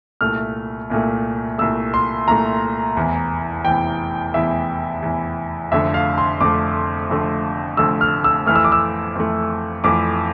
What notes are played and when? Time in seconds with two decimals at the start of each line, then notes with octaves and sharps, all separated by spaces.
0.21 C2 A#2 A3 F6
0.90 C2 A#2 A3
1.58 C2 A#2 A3 E6
1.94 C6
2.28 C2 A#2 A3 A#5
2.96 F1 E2 E3
3.65 F1 E2 E3 G5
4.34 F1 E2 E3 E5
5.02 F1 E2 E3
5.72 F1 F2 D3 A3 E5
5.94 F5
6.18 C6
6.40 F1 F2 D3 A3 D6
7.10 F1 F2 D3 A3
7.77 F1 F2 D3 A3 E6
8.01 F6
8.24 E6
8.46 F2 E3 A3 F6
8.55 E6
8.64 D6
8.72 E6
9.15 F2 E3 A3
9.84 F2 E3 A3 D6